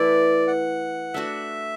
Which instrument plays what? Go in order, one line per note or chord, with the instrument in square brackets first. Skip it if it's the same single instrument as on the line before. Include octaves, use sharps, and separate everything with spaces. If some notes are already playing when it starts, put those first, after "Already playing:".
Already playing: [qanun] E3 A3 E4 B4 [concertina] D5
[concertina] F#5
[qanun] A3 D4 F#4 [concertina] E5